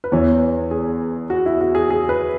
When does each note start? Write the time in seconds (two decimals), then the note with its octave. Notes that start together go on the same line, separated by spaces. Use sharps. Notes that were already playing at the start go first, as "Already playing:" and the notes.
0.04 B4
0.12 E2 E3 B3 C#5
0.71 G#4
1.30 F#4
1.46 E4
1.61 F#4
1.75 G#4
1.90 G#4
2.09 B4